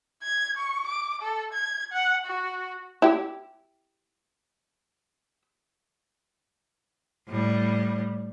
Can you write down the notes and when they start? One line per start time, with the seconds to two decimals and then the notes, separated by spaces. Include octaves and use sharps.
0.23 G#6
0.57 C#6
0.87 D6
1.22 A4
1.53 G#6
1.92 F#5
2.26 F#4
3.02 E4 G4
7.29 A2 G3